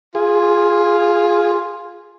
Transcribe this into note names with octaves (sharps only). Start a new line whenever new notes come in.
F4 G#4